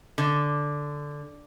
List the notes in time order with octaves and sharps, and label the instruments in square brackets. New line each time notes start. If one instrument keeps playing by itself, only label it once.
[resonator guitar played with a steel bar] D3